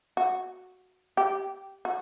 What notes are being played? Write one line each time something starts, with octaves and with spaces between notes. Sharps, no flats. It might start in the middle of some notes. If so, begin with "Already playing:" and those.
F#4
G4
F#4